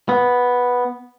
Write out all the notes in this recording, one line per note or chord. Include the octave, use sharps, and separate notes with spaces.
B3